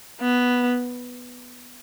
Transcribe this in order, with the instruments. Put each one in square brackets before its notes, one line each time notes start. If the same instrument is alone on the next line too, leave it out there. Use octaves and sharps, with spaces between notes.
[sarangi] B3